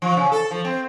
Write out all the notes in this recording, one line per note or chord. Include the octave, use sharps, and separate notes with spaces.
F3
C#3
A4
F3
C4